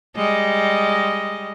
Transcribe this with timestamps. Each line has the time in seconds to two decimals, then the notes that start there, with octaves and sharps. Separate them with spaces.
0.16 G3 G#3 D#5